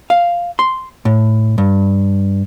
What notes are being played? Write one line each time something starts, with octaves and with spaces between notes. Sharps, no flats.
F5
C6
A2
G2